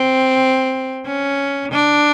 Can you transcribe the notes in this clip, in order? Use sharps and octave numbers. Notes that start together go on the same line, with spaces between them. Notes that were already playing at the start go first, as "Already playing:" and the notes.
Already playing: C4
C#4
D4